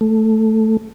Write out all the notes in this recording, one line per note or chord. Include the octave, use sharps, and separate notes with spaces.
A3